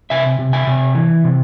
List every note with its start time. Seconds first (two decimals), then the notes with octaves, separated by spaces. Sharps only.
0.10 C3 E5 G#5
0.39 C3
0.53 E5 G#5
0.67 C3
0.95 E3
1.24 C3